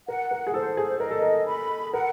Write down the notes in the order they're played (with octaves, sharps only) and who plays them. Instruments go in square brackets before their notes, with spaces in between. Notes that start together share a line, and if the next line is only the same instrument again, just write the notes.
[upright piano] A#4 [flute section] F#5
[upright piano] A#4
G#4
[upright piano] A4 [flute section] C5
[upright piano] G#4
[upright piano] A#4 [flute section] D#5
[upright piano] A4
A#4
[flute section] B5
[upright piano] A#4 [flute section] F#5